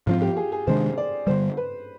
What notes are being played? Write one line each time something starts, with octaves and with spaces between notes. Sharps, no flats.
G#2 F3 C4 F4
G4
G#4
G#4
C3 D#3 G#3 D4 C5
D5
G2 D3 G3 C5
B4